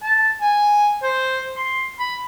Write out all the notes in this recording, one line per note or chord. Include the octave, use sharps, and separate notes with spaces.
A5
G#5
C5
C6
B5